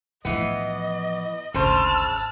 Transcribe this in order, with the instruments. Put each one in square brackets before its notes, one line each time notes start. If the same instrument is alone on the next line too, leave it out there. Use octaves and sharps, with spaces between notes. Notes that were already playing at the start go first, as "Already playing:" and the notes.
[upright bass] A2 F3 [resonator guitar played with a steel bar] E3 B3 [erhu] D#5
[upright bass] G#1 D2 [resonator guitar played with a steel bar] C#3 C5 [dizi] A5 [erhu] F6